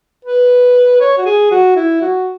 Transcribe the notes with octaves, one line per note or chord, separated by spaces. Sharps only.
B4
C#5
F#4
G#4
F#4
E4
F#4